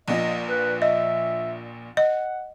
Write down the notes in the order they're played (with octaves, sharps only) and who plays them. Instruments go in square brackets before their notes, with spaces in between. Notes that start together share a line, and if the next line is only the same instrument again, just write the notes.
[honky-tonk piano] A#1 A#2 [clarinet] D#5
[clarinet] B4
[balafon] D#5 [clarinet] E5
[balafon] D#5 [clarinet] F#5